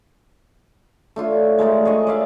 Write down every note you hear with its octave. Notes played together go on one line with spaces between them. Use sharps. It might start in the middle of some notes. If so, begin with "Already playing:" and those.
A3 D4 F4 C#5
G#3 A3 A#4 D5
G#4 C#5 D#5
D5 E5 F5